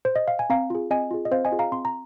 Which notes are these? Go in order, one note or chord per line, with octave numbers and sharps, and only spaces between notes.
C5
D#5
F5
G#5
C4 F5 A#5
F4 G#4
C4 D#5 G#5
F4 G#4
D#5
C4 C5 F5
D#5 G#5
F4 G#4
F5 A#5
C4 C6
A#5